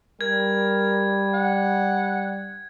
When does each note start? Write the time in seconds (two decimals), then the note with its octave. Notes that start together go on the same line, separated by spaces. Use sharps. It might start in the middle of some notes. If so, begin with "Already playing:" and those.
0.21 G3 A#4 G#6
1.34 F#5